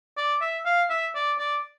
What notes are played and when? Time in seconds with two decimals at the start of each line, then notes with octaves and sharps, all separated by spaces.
0.17 D5
0.41 E5
0.65 F5
0.90 E5
1.15 D5
1.38 D5